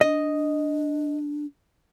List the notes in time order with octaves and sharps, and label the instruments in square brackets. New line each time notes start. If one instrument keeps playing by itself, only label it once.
[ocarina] D4 [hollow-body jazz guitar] D#5